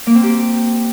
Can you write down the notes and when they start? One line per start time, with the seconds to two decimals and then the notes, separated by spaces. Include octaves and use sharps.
0.07 A#3
0.15 C4
0.23 G4